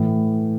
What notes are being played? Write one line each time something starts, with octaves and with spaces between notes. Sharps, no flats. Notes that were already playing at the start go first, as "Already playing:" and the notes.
Already playing: A2 E3